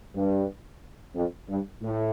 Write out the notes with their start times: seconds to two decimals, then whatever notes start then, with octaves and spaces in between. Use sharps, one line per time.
0.15 G2
1.15 F2
1.48 G2
1.82 A2